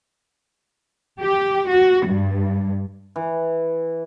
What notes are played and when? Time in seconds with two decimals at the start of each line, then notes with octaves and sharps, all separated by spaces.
1.21 G4
1.68 F#4
2.06 G2
3.16 E3